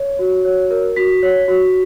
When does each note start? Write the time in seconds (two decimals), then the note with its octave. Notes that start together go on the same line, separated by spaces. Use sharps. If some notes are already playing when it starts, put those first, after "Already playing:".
Already playing: C#5
0.19 F#4
0.45 C#5
0.71 A#4
0.96 F#4 B6
1.23 C#5
1.48 F#4